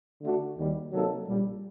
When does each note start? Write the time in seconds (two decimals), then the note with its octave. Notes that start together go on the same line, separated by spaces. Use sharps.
0.22 D3 A3 D4 F#4
0.57 D#2 D#3 G3
0.92 C3 F#3 A#3 D#4 A4
1.26 A#1 A#2 G3